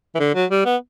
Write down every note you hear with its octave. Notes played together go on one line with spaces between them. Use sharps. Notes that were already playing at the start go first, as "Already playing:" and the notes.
E3
D3
F#3
G3
B3